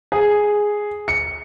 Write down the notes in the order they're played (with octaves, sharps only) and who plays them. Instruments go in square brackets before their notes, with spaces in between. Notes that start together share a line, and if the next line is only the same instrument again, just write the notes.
[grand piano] G#4
C#7